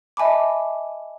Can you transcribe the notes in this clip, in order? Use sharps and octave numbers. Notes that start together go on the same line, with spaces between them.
D#5 E5 G#5 A5 B5 D6